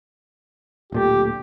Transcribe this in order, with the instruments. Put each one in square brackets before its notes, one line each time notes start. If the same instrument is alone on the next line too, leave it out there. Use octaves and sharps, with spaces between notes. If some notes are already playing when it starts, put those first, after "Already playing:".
[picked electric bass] D1 A#2 A3 [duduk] G4